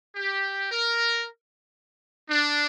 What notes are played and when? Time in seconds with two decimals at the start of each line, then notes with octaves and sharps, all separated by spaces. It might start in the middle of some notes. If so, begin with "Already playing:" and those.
0.16 G4
0.70 A#4
2.29 D4